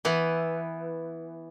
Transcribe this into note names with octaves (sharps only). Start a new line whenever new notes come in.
E3 B3 E4